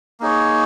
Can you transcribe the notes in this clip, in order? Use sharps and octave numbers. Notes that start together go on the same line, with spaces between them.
A#3 D#4 G#4 C#5